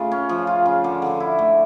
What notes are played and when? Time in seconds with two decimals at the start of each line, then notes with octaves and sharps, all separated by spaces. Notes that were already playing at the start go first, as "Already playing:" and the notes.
Already playing: C#3 A3 F4
0.12 C#4
0.29 F3
0.47 F4
0.66 C#3
0.84 D3
1.02 D3
1.20 E4
1.39 A3